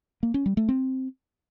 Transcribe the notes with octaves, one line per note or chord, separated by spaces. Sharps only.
A#3
C#4
G3
A3
C4